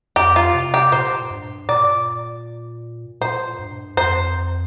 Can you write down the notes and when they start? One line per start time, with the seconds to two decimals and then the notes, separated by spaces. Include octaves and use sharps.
0.16 F2 G4
0.36 F4
0.54 C3
0.74 G4
0.92 A#2 C5
1.31 G2
1.69 A#2 D5
3.21 A#2 C5
3.59 G2
3.97 F2 C5